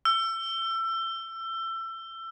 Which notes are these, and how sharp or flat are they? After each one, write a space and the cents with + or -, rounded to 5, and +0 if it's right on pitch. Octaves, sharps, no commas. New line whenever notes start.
E6 +25